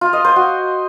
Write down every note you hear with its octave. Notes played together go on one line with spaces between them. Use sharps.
F4
D#5
C5
F#4